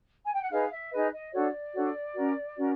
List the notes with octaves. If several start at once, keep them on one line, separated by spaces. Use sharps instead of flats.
G#5
G5
F#5
D#4 G#4 B4 F5
E5
D#4 G#4 B4 D#5
D#5
D4 F#4 A4 C#5 D5
D4 F#4 A4 C#5
C#4 F#4 A#4
C#4 F#4 A#4